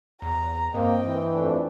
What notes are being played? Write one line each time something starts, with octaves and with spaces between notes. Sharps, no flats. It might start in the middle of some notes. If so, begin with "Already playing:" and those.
E2 A#5
G2 A#3 C4 D#5 G5
E3
F2 A3 D4